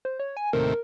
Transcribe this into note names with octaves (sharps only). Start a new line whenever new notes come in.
C5
C#5
G#5
D#2 A2 C3 A#4